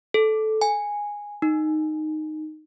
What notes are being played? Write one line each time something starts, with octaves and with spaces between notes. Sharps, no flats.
A4
G#5
D#4